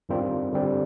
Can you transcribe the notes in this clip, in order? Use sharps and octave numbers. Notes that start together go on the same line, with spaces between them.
G2 D#3 G3 C4 F4
D3 G3 C4